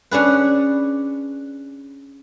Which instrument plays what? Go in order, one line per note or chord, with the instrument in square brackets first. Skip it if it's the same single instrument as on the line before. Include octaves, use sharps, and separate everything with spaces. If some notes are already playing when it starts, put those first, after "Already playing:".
[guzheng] C#4 D4 G#4 B4